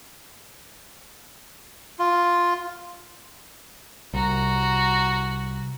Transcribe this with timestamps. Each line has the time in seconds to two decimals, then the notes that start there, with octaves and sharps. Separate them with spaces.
1.99 F4
4.14 C2 F#4 A#5